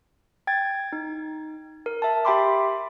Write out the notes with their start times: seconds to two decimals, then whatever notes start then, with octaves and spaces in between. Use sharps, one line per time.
0.47 G5 G#6 A6
0.92 D#4
1.86 A#4
2.02 E5 A5
2.25 G4 E5 G5 B5 C6 D6